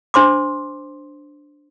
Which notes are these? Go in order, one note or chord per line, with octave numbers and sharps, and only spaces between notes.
D4 C5 C6 D6